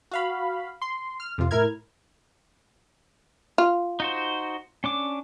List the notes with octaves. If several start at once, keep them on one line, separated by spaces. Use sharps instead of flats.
F#4 F5 B5
C6
F6
F2 C3 F4
A2 E4 A#4 F6 G#6
F4
D#4 F#4 C5
C#4 D4 D6